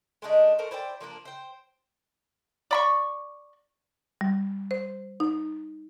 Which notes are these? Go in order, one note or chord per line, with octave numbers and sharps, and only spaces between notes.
G#3 A3 D4 D#4
A3 A#4 C5
E4 C5 D5 G5
F3 A#3 D4 A#4
C5 G5
D5 B5 C#6
G3
C5
D#4